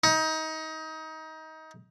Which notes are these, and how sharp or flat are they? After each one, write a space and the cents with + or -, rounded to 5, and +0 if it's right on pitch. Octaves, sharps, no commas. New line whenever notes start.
D#4 +25